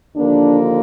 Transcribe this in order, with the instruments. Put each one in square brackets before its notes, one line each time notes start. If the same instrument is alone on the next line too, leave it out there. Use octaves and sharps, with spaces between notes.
[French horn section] D#2 D3 F3 A#3 D4